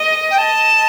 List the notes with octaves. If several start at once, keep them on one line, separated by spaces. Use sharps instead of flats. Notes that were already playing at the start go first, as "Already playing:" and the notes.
Already playing: D#5
G5
A5